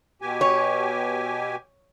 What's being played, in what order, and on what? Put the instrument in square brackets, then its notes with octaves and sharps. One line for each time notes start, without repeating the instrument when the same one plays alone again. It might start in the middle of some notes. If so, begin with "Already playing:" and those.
[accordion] B2 G4 G#5
[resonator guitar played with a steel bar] C#5